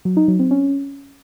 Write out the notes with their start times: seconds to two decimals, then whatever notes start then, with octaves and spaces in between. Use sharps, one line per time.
0.05 F#3
0.17 D#4
0.28 F#3
0.39 C4
0.51 C#4